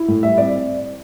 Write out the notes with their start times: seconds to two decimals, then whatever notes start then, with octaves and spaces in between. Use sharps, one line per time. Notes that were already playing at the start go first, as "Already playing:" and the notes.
Already playing: E4
0.08 A2
0.23 G3 E5
0.38 C4 D5